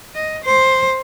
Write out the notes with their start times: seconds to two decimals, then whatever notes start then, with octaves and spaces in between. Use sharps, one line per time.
0.15 D#5
0.45 C5